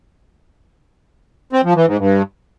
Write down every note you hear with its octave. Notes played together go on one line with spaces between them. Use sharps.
C4
F3
E3
G#2
G2